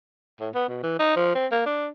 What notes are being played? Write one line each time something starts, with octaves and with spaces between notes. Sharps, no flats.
A2
B3
B2
E3
D#4
F3
C4
A#3
D4